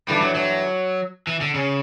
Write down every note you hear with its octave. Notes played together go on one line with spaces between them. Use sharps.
G2 E3 G3 A3 D4
F#3
F#3
E3
D3
C#3